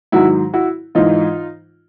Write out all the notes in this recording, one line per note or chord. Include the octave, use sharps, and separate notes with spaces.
G#2 D#3 F#3 E4 F#4
E4 F#4
G#2 E3 D#4 F4